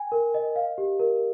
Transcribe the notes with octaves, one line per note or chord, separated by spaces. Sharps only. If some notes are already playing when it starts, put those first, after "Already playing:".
Already playing: G5 G#5
A#4
D#5
F5
G4
A#4